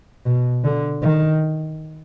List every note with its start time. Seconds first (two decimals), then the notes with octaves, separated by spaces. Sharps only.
0.26 B2
0.64 D3
1.02 D#3